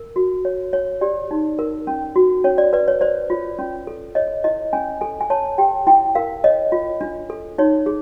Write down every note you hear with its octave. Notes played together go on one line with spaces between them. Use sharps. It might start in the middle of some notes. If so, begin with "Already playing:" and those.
Already playing: A#4
F#4
C#5
C#5
G4 D5
D#4
A#4
C#4
F#4
C#4 C#5
D5
B4 D5
C#5
C5 D5
F4
C#4
A4
C#5 D#5
E4 D#5
C#4 G#5
A4 G#5
G#5
C#5 A5
G4 G5
E4 G5
A#4 F5
C#5 D#5
F4
D4
A4
D#4 C#5
G#4